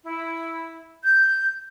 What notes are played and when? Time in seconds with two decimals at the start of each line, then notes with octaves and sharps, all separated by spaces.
0.04 E4
1.03 G6